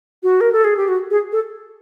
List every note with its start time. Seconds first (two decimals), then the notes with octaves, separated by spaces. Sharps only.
0.23 F#4
0.41 A#4
0.52 A4
0.64 G#4
0.77 G4
0.88 F#4
1.11 G#4
1.32 A4